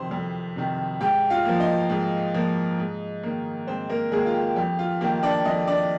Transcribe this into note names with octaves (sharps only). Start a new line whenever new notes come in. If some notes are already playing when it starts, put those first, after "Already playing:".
Already playing: F2 C3 D#3 C5 C6
F2
C3 D#3
G#2 G4 G5
F4 F5
F3 A#3
D#4 D#5
G#2
F3 A#3
G#2
D#3 A#3
G#2 C4 C5
A#3 A#4
D#3 G#3 A#3 G#4
F4
G4
F2 G4
F4
D#3 A#3 G4
D4 D5
F2 D#4 D#5
D4 D5